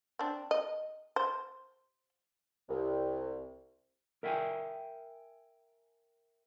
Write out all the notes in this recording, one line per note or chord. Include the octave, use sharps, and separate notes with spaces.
C4 D4
D#5
C5
C2
A#4 E5 F5 G5 G#5